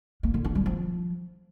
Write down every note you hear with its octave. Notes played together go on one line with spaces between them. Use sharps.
A#3
D3
D4
G3
F3